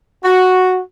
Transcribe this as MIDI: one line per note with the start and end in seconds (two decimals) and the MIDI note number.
0.24 0.80 66